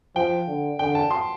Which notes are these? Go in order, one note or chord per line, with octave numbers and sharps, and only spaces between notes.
F3 G5
D3
D3 G5
A5
C6